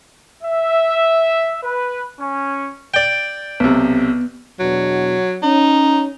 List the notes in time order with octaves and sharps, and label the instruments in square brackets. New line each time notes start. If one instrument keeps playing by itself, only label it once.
[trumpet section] E5
B4
C#4
[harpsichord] D5 G5
[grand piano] B1 C3 [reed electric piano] B3
[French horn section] E2 B2 D4 [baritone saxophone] F#3
[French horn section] C#4 [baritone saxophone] D#4